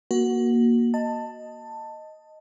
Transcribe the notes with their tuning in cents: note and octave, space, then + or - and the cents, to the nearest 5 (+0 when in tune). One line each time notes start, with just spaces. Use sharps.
A#3 +20 F#4 +0
D#5 +0 A5 +15